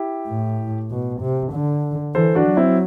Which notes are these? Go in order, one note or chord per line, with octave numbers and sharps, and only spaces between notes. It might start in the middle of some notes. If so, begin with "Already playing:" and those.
Already playing: E4 G4
A2
B2
C3
D3
E3 A4 C5
D4 F#4
F#3
C4 E4